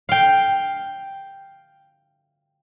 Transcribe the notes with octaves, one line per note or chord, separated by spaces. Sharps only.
F5 G5